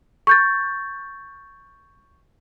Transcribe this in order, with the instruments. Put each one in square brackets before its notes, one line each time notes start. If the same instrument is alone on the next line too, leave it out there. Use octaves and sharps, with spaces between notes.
[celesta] C#6 G6 A6